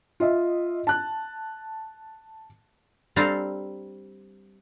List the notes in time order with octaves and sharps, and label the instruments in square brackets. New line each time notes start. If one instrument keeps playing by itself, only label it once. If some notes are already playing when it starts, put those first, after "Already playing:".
[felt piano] F4 D#5 E5
A5 F#6
[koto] G3 C4 D4 A4 F5 A#5